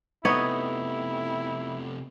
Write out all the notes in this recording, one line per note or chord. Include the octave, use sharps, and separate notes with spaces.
C3 A3 B3 D#4 E4 C#5